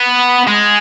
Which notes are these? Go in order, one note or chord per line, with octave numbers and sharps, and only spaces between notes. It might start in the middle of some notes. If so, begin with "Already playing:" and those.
Already playing: B3
G#3